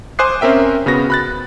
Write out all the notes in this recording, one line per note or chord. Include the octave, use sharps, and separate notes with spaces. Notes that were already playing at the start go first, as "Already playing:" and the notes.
C5 G#5 D6 D#6 F#6 C7
C4 C#4 A#4 E5 G5
C#3 B3 F#4 A#6
B5 F#6 A6